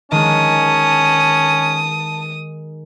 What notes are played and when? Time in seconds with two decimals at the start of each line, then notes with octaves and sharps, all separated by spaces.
0.12 D#3 G#3 C#4 A5 D#6